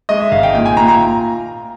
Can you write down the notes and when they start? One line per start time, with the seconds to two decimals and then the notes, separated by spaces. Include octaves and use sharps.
0.09 G#3 D#5
0.20 E5
0.31 G#1 F5
0.43 G5
0.54 A#2 G5
0.65 G#5
0.77 A#2 A#5
0.88 A#5